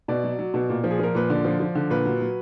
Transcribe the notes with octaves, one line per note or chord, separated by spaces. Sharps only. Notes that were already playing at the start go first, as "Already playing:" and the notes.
B2 D5
F#3
F#3
B2
A#2
F3
G#4
F3 A#4
A#2 B4
D3 D5
F3
F3
D3
A#2 B4
F#3
F#3